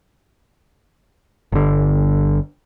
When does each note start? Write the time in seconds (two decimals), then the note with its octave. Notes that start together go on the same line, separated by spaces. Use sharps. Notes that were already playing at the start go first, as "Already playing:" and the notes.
1.52 G1 D3